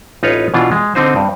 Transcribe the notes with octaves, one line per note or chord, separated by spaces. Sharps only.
A1 D#4 F4 B4 C#5 F5
B2 E3 D4 F4
G#3
D3 C4 D#4 C5
G2